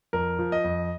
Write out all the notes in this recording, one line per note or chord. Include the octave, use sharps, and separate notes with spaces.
F2 A#4
F3
D#5
F2